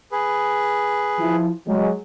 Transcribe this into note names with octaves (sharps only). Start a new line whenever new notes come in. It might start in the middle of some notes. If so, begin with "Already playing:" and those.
G#4 B4
F3 E4
F#3 G#3